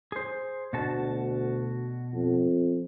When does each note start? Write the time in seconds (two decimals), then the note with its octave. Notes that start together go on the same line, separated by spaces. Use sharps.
0.12 G#4 C5
0.73 D2 B2 F#4 A5
2.14 F2